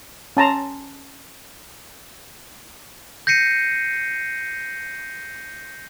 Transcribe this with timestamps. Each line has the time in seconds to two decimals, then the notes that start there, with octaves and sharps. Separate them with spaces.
0.37 C#4 A5 A#5 C6
3.27 G6 A#6 C7 C#7 D#7